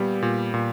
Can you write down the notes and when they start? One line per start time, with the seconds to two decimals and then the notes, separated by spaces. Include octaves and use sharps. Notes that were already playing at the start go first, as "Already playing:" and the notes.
Already playing: A#2 G3 B3
0.22 A#2
0.54 A#2